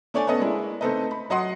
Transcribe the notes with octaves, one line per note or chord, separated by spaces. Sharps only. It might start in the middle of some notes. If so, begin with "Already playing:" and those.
A3 D4 C#5 D5 G#5
B3 C#4 A4 D#5
G#3 A#3 D4 E4
A3 C4 D#4 A4 B4 D#5
B5
F#3 D#5 F#5 C6 D#6